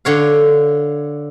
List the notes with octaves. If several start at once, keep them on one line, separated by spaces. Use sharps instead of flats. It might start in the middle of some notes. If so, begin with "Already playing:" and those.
D3 C#5 F5